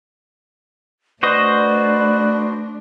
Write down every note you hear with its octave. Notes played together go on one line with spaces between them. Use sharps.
A3 D4 F#4 B4 C5 D5 D#5